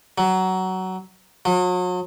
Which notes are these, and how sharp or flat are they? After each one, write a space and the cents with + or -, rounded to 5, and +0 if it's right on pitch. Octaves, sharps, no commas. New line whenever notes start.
F#3 +15
F#3 -40